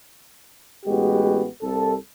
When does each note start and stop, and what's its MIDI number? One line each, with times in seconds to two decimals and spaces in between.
0.86 1.47 33
0.86 1.47 56
0.86 1.47 59
0.86 1.47 66
0.86 1.47 67
1.62 1.95 36
1.62 1.95 69